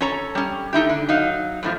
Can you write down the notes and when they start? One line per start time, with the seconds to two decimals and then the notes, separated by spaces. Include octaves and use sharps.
0.01 C#4 A4 C#5 A#5
0.35 G3 C#4
0.73 A3 D#4 E4 G4
0.90 D3
1.09 F#3 D#4 F5
1.63 F#2 A2 F3